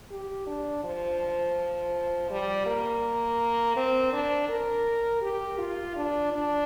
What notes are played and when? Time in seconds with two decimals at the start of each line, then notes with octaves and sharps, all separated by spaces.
0.11 G4
0.47 D4
0.84 F3
2.30 G3
2.66 A#3
3.76 C4
4.13 D4
4.48 A#4
5.22 G4
5.58 F4
5.96 D4
6.32 D4